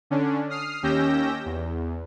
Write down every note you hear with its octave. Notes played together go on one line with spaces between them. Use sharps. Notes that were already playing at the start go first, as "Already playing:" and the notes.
D3 C#4 D4
D#6 F6 C7
D#2 C#4 G4 E6 G6 A#6
E2